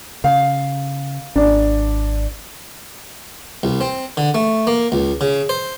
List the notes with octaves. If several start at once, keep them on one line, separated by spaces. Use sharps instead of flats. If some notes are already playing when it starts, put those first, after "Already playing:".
C#3 F5
G#1 D4
C2
C4
D3
A3
A#3
C#2
C#3
C5